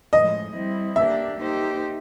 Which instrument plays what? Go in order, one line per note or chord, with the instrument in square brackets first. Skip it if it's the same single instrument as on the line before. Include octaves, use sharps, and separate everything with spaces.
[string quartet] A2 F3 G#3 [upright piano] D#5
[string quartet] G3 C4 E4
[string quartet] A#3 D4 G4 [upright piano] E5
[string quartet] A#3 D#4 G4 C5